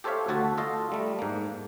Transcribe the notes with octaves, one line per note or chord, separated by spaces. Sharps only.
G4 A4 C5 C#5 E5 F5
D2 F#4 A4 A5
F4 A4 D#5 F5
G3 A3
G#2 A#3